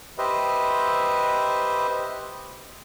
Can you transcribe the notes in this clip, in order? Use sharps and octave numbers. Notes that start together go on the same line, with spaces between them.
G4 B4 C5 D#5 E5